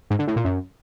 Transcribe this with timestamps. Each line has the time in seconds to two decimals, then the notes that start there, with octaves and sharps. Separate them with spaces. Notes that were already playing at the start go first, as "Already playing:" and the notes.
0.10 G#2
0.19 D3
0.28 A2
0.36 A#2
0.45 F#2